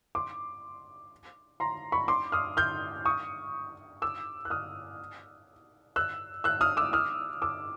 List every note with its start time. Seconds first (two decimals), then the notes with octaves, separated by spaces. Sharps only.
0.15 C6 D6
1.60 A#5 C6
1.92 B5 C#6
2.08 C6 D6
2.32 D#6 F6
2.57 F6 G6
3.05 C#6 D#6
4.02 D6 E6
4.45 F#6
4.50 D#6 F6
5.96 E6 F#6
6.44 E6 F#6
6.61 D#6 F6
6.77 D6 E6
6.93 D#6 F6
7.42 D6 E6